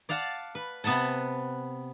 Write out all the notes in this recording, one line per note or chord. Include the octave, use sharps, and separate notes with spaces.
D5 F5 F#5 A5
B4
C3 B3 B4 F#5 A5